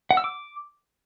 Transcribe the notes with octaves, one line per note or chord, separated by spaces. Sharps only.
F#5
E6
D6